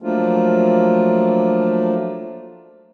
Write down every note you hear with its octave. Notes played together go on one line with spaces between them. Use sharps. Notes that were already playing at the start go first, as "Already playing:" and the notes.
F3 F#3 A3 A#3 D4 F4